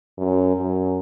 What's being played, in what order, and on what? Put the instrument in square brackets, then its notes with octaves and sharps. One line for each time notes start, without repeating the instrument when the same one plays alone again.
[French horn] F#2
F#2